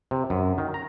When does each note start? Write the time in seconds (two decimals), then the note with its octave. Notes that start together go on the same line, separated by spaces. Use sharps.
0.11 C3
0.30 F#2
0.58 D#3
0.74 A#5